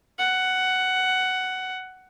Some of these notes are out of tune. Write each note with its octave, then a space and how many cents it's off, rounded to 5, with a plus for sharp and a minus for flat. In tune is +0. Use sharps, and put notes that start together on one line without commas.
F#5 +10